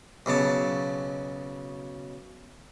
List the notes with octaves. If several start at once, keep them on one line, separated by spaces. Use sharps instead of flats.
B1 C#3 F#3 A5